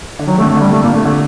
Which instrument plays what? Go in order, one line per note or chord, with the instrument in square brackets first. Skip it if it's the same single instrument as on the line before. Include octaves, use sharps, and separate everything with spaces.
[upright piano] D3
[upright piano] D#3 [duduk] F#3
[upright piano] C3 [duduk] A3
[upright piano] D3
[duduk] A3
[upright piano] D3 [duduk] G3
[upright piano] C3 [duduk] A3
[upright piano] A#2 [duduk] A#3
[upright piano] D3 [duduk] A3
[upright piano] D3 [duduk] A3